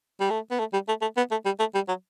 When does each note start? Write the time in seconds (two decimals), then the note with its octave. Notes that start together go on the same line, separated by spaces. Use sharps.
0.20 G3
0.30 A3
0.51 B3
0.59 A3
0.73 G3
0.88 A3
1.02 A3
1.17 B3
1.31 A3
1.45 G3
1.59 A3
1.75 G3
1.88 F#3